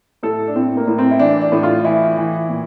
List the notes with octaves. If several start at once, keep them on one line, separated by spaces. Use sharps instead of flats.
A2 A4
D4
A2 C4
A#3
A2
C4
E4
E3 D4
D4
A2
F4
E3 E4
E3
A#2